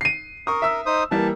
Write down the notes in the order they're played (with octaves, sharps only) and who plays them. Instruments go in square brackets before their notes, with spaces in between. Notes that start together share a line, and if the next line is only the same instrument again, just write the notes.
[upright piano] C7 D#7
[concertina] A#4 [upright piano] C#6 D#6
[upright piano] E5 E6
[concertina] D#4 C5 D#6
[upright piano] E3 G3 A#3 [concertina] A5